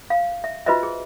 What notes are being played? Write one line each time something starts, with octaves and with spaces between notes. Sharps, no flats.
F5
E5
F4 F#4 B4 C5 D#5 E5
G#4